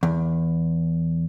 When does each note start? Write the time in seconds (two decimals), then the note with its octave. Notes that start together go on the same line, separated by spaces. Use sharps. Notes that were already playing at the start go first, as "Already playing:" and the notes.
0.03 E2